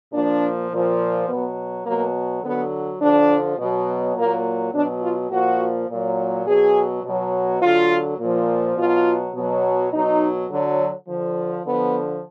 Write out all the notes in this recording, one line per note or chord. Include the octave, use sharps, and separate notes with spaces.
A#2 F3 D4
A#2 F3
B2 F#3 B3
B2 F#3 A#3
D3 F#3 B3
D3 F3 D4
B2 F#3
A#2 F#3 A#3
B2 F#3 D4
F4
A#2 F3 F#4
A#2 F#3
B2 F#3 G#4
B2 F#3
D3 F#3 F4
A#2 F3
B2 F#3 F4
B2 F#3
B2 F#3 D#4
D3 F#3
D3 F3
D3 F3 B3